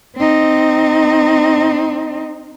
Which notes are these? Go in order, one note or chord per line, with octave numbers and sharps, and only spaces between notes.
C4 D#4